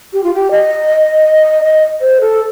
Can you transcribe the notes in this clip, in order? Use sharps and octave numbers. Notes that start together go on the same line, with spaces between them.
G4
F4
G4
D#5
D#5
C5
A4